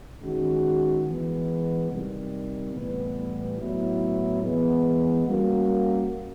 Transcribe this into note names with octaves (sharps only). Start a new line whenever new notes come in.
D#3 G#3 C#4 F#4
E3 G#3 B3
C3 D#3 G3
A2 E3 G3 B3
A2 F#3 B3 E4
E3 G#3 B3
G3 A#3 C#4 F#4